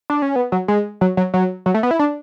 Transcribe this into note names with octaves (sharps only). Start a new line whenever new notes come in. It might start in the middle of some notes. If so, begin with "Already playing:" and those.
D4
C#4
B3
F#3
G#3
F#3
F#3
F#3
F#3
A3
B3
E4
D4